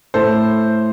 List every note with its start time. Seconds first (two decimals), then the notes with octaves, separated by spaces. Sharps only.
0.14 A2 A4 C5